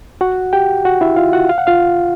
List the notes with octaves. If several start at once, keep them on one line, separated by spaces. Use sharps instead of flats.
F#4 F#5
G4 G5
F#4 F#5
E4 E5
F4 F5
F#4 F#5
F5
F#5
F4 F5